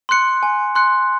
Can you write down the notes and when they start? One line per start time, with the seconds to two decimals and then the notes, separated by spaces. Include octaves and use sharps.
0.09 C6 F#6 C#7
0.43 G#5
0.75 C6 F#6 C#7